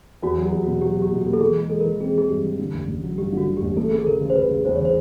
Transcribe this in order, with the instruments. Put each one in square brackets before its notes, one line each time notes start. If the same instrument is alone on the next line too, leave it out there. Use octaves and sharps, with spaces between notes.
[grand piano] E2 [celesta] F#4
[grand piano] F#3
[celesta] G4
[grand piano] E2
[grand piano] B2 [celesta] F#4
[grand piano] F#3 [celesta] G4
[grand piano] F#3
[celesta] G4
[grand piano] B2
[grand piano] A#3 [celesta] G4
[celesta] A4
[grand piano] E3 [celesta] G#4
[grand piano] G#3
[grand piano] G#3 [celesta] A4
[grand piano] E3 [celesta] A#4
[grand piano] C4 [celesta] G#4
[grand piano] E3 [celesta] G#4
[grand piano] G2 [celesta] G4
[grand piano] E3
D3
A1
A1
F#3
[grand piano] G2 [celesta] G4
[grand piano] D3 [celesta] F#4
[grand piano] D3
[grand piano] A1 [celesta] G4
[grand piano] A3 [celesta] A4
[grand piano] A3 [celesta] G#4
[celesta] A4
[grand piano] C#3 [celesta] A#4
[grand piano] C#3
[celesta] C5
[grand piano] C#3 [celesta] B4
[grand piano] C#3
[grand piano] E2 [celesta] C5
[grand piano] C#3 [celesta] C#5
[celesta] C5